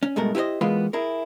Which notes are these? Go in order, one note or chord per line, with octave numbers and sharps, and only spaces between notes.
C#4
G2 B2 G#3 A3 A#4
E4 G4 B4 C5 D#5
E3 G#3 A#3 B3 F4 B4
E4 G#4 A#4